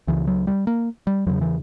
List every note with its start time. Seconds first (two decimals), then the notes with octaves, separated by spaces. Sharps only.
0.07 C#2 C#3 E3
0.27 F#3
0.47 G3
0.67 A#3
1.07 G3
1.27 E2 C#3 F#3
1.41 E3